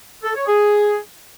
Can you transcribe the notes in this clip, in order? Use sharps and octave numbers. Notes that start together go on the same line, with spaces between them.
A4
C#5
G#4